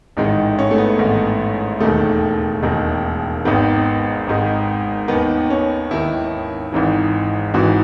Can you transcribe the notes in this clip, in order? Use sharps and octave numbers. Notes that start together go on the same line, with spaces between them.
A1 G#2 D#3 G#3
C#4
A3
B3
A1 G#2 D#3
E1 D#2 D#3 A3
E1 D#2 D#3
G#1 G#2 D#3 B3
G#1 G#2 D#3
D#2 D#3 B3
C#4
D#2 D#3 E4
G#1 G#2 E3
G#1 G#2 E3 F#4